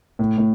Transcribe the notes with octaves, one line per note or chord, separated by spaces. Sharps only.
A2
A2